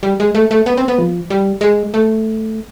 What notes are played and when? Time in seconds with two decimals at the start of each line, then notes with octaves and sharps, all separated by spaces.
0.03 G3
0.20 G#3
0.35 A3
0.51 A3
0.66 B3
0.77 C4
0.88 B3
0.98 F3
1.30 G3
1.61 G#3
1.94 A3